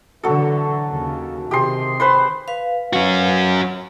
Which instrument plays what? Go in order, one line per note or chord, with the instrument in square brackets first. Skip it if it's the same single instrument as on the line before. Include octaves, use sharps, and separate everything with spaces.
[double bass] D3 E3 [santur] F#3 A4
[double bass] D#2 C#3
[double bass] C3 D#3 [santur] G4 G#4 C6
[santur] B4 C5 C6
[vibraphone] B4 F5
[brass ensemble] F#3 [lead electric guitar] C#4 F#4